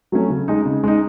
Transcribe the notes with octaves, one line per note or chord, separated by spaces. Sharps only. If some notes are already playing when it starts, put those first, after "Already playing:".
F#3 A3 C#4
C#3
G#3 D#4
C#3
G#3 D#4